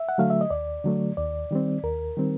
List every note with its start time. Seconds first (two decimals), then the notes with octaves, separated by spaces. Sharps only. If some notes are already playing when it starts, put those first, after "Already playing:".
Already playing: E5
0.09 F#5
0.18 D3 F#3 A3 F5
0.30 E5
0.41 D#5
0.50 D#2 D5
0.84 D3 F#3 A3
1.17 D#2 D5
1.51 D#3 G3 C4
1.84 D#2 A#4
2.17 D#3 G3 C4